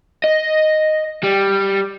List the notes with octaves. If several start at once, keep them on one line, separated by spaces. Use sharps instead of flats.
D#5
G3